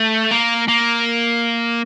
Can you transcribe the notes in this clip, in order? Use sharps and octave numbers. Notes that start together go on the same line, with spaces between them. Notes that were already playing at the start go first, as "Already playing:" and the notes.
Already playing: A3
A#3
A#3